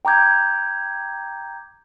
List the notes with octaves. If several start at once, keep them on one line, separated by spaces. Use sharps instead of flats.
G5 A#5 D6 G6 G#6